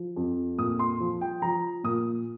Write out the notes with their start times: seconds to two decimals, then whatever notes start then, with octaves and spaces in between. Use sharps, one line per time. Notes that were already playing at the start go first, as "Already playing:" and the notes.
Already playing: F3
0.16 F2
0.58 A#2 D#6
0.79 C6
1.00 F3
1.21 G5
1.42 F3 A#5
1.84 A#2 D#6